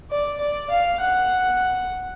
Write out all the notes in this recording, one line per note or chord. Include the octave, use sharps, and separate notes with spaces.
D5
D5
F5
F#5